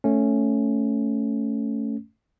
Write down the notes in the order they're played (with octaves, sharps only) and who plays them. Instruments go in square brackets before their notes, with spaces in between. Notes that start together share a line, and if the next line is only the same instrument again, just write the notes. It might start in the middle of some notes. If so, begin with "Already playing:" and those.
[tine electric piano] A3 C#4